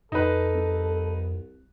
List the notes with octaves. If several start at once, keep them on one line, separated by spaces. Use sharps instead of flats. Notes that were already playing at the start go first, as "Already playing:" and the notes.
F2 D#4 A4 B4
C2